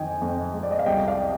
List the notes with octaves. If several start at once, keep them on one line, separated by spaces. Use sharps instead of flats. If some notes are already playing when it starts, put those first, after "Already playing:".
Already playing: F2 D#3 D#5 G5 G#5
F2
G#3
D5
D#5
F5
C2 D#5 G5
D5 F5